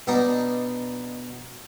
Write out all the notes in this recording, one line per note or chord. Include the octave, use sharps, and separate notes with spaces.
B2 D4 D#4